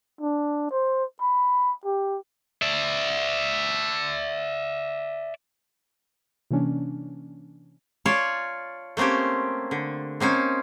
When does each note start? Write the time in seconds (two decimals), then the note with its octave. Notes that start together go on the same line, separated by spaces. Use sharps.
0.21 D4
0.71 C5
1.21 B5
1.85 G4
2.62 D5 E5
6.51 C3 E3 A#3 C#4 D4
8.05 F4 C#5 D5 A5
8.97 A3 A#3 C4 C#4 G4
9.71 D3
10.20 A#3 C4 C#4 D#4